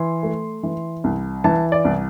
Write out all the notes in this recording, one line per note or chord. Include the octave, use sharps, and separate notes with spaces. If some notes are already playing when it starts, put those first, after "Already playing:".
Already playing: E3 C6
A3
E3
C2
E3 A5
D5
C2